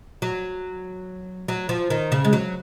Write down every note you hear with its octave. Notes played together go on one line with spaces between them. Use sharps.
F#3
F#3
F3
D#3
C#3
G#3
F#3